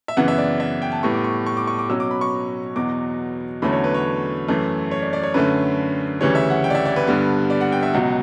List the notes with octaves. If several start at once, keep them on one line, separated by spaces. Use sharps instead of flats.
E5
F#2 C#3 E3 B3 F#5
E5
D5
E5
G5
A5
A2 G3 B3 C#6
D6
C#6
C#6
D6
C#6
D6
B2 F#3 C#4 E6
D6
B5
C#6
E2 B2 F#3 D6
E2 D3 F#3 A3 C#4 B5
C#5
B4
C#5
F#2 E3 A3
C#5
D5
D5
C#5
F#2 D3 A3 C#4 B4
D2 C#3 E3 G3 C#5
E5
F#5
G5
D5
E5
D5
B4
G2 D3 G3 B3
D5
F#5
G5
E5
C#2 B2 F#3 F#5